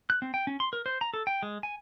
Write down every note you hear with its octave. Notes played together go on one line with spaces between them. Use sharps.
F#6
C4
G5
C#4
C6
A#4
C5
A#5
A4
G5
G#3
G#5